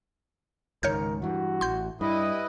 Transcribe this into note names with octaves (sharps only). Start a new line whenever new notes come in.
C#2 G#2 D#3 A#4 C#5 F6 G6
G2 E3 F#4
A1 C6 G6
G2 G3 E4 B4 D#5